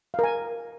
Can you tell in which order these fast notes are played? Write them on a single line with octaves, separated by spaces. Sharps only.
F5 A#4 G#5